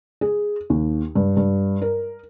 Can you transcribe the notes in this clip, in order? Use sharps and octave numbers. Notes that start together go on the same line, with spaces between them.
G#4
D#2
G2
G2
A#4